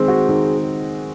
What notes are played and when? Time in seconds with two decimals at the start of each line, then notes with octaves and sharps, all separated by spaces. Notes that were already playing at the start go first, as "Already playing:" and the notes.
Already playing: D#3 G#3 C4 G#4
0.08 F#4
0.29 D#3